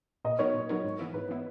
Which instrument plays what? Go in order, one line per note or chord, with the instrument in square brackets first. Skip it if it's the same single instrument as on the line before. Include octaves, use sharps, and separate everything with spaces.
[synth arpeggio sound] A#2 [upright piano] D#5
[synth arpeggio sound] F#3 B3 D#4 A#4 [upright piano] C#5
[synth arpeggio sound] A#2
F#3 B3 D#4 A#4
G#2
E3 B3 E4
[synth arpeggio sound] G#2 [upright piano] B4
[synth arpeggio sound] E3 B3 E4